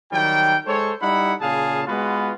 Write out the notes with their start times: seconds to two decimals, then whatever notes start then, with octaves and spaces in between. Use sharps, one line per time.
0.12 D#3 F#3 G3 G5
0.66 G#3 A4 C5 C#5
1.02 G3 D#4 E4 F#5 B5
1.41 A#2 C#3 G#4 F5 A5
1.86 G#3 B3 F4 F#4 B4